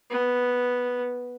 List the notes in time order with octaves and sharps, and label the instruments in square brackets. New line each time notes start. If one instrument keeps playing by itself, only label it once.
[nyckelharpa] B3